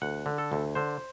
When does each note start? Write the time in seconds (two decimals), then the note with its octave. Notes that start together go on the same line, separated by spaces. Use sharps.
0.02 D2 F#5
0.26 D3
0.38 A4
0.52 D2
0.75 D3 C5